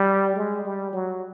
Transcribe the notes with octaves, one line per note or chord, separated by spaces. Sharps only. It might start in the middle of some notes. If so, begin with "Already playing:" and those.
Already playing: G3
G#3
G3
F#3